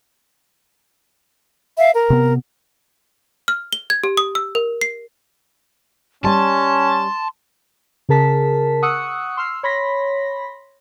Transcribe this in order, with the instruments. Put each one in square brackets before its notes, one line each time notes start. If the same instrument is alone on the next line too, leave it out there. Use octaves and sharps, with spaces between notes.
[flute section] E5 F5
A#4
[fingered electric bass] C3 B3
[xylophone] F6
G7
G#6
G4
D#6
E6
A#4
C7
[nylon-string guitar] G3 G#5 [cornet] C#4 [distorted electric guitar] A5 [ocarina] C6
[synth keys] C#3 G#4 A#4 A5 B6
F#5 C#6 D#6 E6 F#6 C#7
C6 E6 F6 C7
C#5 B5 C6 A#6 B6